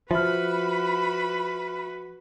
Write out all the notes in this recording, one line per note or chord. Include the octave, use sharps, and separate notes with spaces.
F3 F#4 B4 E5 B5 F6